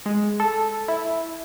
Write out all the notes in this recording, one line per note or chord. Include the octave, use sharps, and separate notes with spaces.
G#3
A4
E4